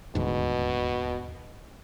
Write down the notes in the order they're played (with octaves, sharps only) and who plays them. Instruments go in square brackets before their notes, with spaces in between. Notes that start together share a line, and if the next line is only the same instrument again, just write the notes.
[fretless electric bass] D#1 D2 G#2 [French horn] B2